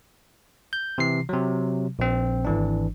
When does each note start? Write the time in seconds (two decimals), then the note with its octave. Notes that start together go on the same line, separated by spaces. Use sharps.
0.73 G6
0.98 C3 E3 C7
1.29 C3 F#3
1.99 A#1 C4
2.45 G#1 E3 D4